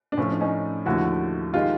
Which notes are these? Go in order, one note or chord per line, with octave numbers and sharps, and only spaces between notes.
D4
A2 F3 A3 C#4
D4
C#4 D#4
D#2 D3 F3 A3 E4 F#4
D#3 G#3 F4 G4